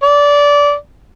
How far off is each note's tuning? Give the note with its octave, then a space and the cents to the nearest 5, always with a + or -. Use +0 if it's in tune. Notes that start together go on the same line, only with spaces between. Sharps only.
D5 -20